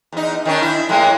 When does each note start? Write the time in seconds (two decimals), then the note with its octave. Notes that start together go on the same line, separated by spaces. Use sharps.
0.12 E2 D#4
0.45 D#3 C#4 D4
0.62 E4
0.89 A2 G#3 A#3